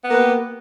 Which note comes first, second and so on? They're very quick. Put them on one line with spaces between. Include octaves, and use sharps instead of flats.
B3 A#3 B4 G4